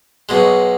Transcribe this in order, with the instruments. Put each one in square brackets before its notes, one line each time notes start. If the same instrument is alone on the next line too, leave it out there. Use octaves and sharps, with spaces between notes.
[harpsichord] B1 B2 G#3